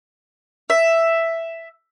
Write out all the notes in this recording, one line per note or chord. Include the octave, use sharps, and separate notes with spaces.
E5